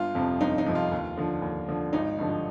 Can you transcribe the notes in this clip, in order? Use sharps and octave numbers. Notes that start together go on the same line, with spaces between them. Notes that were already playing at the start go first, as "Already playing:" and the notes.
Already playing: G1 F4
F2 C3 F3
G1 D#4
D#4
F2 C3 F3
F4
D#2
D3 F3
D#2
D3 F3
G#1 D#4
G2 D3 F3